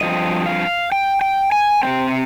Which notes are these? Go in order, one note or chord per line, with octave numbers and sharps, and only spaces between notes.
G2 F3 C4 D#5
F5
G5
G5
G#5
C3 G3 C4 G5